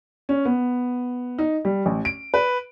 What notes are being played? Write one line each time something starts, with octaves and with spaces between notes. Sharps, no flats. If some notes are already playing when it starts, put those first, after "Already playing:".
C#4
B3
D#4
G3
A1
D7
B4